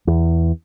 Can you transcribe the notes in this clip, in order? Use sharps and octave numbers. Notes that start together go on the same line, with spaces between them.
E2